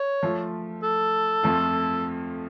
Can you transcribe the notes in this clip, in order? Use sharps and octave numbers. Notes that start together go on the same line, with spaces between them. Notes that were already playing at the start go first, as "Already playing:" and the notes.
Already playing: C#5
F3 A3 F4
A4
F2 F3 A3 F4